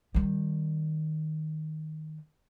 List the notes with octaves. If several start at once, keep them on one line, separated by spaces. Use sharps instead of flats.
D#3 G3